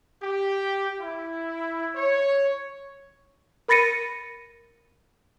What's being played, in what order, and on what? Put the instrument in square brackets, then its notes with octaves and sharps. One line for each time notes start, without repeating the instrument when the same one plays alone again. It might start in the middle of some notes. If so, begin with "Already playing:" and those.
[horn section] G4
E4
C#5
[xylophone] A#4 B5 A6 A#6 C#7 D#7